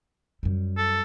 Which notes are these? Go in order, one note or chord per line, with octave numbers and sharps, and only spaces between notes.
F#2 G3
A4